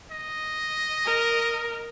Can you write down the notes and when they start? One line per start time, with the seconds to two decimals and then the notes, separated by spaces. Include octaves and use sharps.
0.11 D#5
1.05 A#4